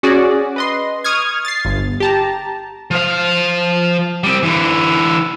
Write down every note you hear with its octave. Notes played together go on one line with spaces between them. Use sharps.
C#4 F#4 G#4 D5
B4 D#5 C6
C#6 D#6 F6 G#6
A6 C7
G1
G4 A5 A#5
F3 F5
G3 C4
D3 E3